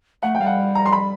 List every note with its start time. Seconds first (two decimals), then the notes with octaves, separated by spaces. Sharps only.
0.23 A3 F#5
0.35 G5
0.41 G3 F5
0.46 F#5
0.75 A#5
0.86 C6
0.92 B5